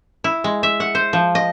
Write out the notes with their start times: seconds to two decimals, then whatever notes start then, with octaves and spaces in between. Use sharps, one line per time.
0.24 E4
0.44 G#3
0.63 E5
0.80 F#5
0.95 C5
1.13 F3
1.35 D#5